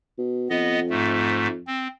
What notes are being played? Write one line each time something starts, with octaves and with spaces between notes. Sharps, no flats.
B2
F2 B3 D#5
G#2 A3
C4